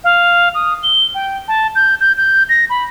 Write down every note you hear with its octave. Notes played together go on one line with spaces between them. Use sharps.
F5
D#6
G7
G5
A5
G6
G6
G6
A#6
B5